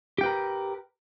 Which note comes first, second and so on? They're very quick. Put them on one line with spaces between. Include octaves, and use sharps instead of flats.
G4 G5 B4 A#4